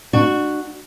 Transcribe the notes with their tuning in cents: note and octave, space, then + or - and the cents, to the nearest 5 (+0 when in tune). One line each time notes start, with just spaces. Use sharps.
D4 +35 F#4 +0